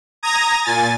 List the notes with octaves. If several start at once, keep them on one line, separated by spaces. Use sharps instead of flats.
A#5 D#6 G#6 A#6
A#2 G#5 A6